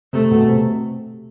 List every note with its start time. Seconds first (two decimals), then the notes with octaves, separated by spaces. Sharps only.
0.13 C3 A3
0.31 B2
0.48 C3